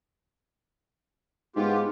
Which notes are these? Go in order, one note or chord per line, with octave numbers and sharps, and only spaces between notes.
G#2 B3 F4 G4